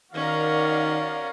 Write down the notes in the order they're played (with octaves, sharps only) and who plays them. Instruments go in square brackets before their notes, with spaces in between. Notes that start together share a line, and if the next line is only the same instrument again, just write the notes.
[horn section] D#3 [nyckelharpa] C#4 A#4 [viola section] F#4 D5 F5